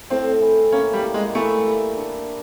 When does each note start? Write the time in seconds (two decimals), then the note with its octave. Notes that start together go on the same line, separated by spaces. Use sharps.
0.10 A2 C4
0.42 E3
0.72 A#3 C#4
0.93 G3
1.04 G3
1.14 G#3
1.35 E3 A3
1.67 G3
1.97 D4